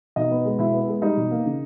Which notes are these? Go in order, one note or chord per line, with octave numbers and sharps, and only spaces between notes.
B2 D#4 D#5
B3
G#3
B2 E4 E5
B3
G#3
G3 D#4 D#5
B2
A#3
C#3